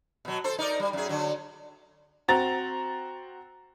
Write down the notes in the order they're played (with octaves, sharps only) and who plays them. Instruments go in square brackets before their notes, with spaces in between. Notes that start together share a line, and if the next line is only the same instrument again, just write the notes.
[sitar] B2 F#3
A4 C5
D#4 A#4 D5
G3
F#2 G#4
D3 F#3
[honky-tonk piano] C4 F#4 A#5 A6